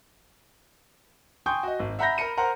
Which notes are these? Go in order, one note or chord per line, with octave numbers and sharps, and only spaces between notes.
G5 G#5 C6 C#6 D#6 G6
F#4 D#5
G#1
E5 F#5 A#5 B5 G6 A#6
A#4 A#5 B5 C#7 D#7
A#4 C5 F#5 A#5